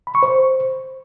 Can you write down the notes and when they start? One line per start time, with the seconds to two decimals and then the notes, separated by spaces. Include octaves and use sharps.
0.07 B5
0.15 C#6
0.23 C5